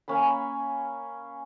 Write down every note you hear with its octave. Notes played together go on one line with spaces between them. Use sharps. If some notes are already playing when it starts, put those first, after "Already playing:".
A#3 C#4 G#5 B5